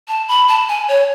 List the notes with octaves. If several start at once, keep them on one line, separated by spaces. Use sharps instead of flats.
A5
B5
A5
G#5
C#5